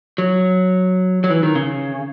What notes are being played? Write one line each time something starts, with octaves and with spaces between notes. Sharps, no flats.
F#3
F#3
E3
D#3
C#3